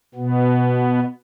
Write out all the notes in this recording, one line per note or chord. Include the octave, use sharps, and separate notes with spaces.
B2 B3